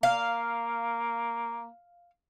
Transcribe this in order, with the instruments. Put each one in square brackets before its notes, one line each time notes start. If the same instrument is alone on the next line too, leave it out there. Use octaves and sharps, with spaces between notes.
[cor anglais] A#3 [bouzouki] F5